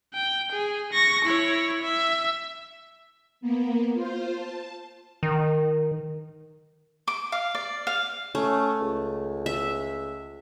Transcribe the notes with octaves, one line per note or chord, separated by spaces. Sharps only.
G5
G#4
C#6 A#6
E4 C#5
E5
A#3 B3
F4 C5
A5
D#3
D6
F5
D5
F5
A3 C#4
C#2
E5